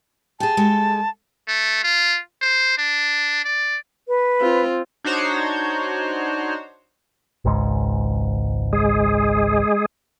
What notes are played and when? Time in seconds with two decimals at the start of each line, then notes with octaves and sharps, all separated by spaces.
0.40 G4 G#4 A5
0.57 G#3 G4 A4
1.48 A3
1.83 F4
2.42 C5
2.78 D4
3.44 D5
4.08 B4
4.40 C4 F4
5.05 D4 D#4 F#4 C5 C#5
7.45 G#1 C#2 G#2
8.73 G#3 G#4